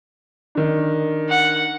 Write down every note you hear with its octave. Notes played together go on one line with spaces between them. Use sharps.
D#3 D4
F#5